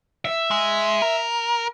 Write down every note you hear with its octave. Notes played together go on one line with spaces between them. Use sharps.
E5
G#3
A#4